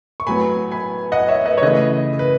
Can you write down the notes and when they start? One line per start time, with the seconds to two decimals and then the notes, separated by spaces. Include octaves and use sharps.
0.20 C#6
0.27 A2 F#3 B3 G#5 B5
0.71 G#5 B5
1.12 D#5 F#5
1.28 C#5 E5
1.45 B4 D#5
1.58 C#5
1.62 C#3 E3 A3 B4 D#5
2.19 B4